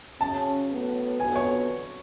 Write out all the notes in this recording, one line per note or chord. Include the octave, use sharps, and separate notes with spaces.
C#3 F#3 C#4 A5
A2 F#3 B3
F2 D3 F#3 B3 G#5
C#5